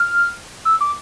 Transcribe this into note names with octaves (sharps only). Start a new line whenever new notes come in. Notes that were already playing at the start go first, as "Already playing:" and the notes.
Already playing: F6
E6
D6